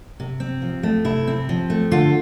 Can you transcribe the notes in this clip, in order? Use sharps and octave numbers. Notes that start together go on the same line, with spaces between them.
C3
C4
F3
A3
C3 E4
C4
F3
A3
D3 F4